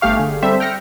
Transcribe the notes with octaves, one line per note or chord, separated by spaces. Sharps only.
G1 A3 G4 F5 C#6
D3 G#4
G3 C4 A4 C5 E5
G5 F6 A#6 C#7